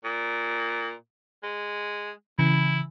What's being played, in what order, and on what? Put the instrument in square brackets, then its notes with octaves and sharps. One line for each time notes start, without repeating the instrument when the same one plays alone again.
[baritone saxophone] A#2
G#3
[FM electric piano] C#3 E3 [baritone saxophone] E4